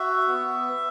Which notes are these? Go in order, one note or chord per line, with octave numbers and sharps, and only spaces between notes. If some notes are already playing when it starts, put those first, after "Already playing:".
Already playing: F#4 E5
B3